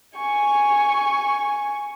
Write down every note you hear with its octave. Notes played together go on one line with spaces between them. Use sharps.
G#5 C#6